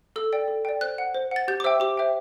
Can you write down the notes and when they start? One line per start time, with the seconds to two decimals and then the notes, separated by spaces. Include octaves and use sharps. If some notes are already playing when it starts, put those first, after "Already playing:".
0.16 A4 E6
0.33 D5 G5
0.48 A4
0.65 D5 G5
0.81 C5 F#6
0.98 F#5
1.15 C5
1.31 F#5 A6
1.48 G4 G6
1.60 D6
1.64 C5 E5 G5 E6
1.80 G4 D6
1.97 C5 E5 G5